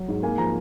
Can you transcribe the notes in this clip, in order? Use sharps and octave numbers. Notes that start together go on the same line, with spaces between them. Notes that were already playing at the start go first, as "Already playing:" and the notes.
Already playing: F#3
G#2
A#3 G#5
F3 A#5